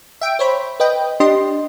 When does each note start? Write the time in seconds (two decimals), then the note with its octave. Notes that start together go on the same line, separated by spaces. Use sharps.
0.21 E5 G5 D7
0.39 C5 C#5 B5
0.80 B4 D#5 G5
1.20 D4 G4 D#5 C6